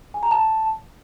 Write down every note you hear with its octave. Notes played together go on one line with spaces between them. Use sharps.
G#5
A#5
A5